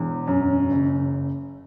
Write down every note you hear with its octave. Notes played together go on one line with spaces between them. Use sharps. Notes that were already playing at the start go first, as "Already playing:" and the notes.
Already playing: E1 E2
F#2
F#1